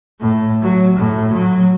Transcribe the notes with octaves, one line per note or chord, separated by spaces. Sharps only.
A2
F#3
A2
F#3